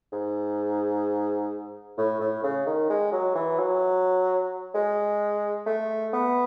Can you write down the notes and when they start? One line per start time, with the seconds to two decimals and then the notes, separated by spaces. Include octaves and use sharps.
0.12 G#2
1.98 A2
2.21 A2
2.43 C#3
2.66 D#3
2.89 G#3
3.12 F#3
3.35 E3
3.59 F#3
4.74 G#3
5.66 A3
6.13 B3